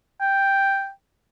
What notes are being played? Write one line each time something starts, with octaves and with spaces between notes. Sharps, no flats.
G5